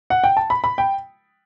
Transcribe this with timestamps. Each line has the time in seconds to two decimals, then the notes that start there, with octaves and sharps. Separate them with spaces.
0.10 F#5
0.24 G5
0.37 A5
0.50 B5
0.64 B5
0.78 G5